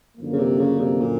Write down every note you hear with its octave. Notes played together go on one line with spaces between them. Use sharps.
F#2 D3 F3 A#3
C#3
C3
C#3
C3
A#2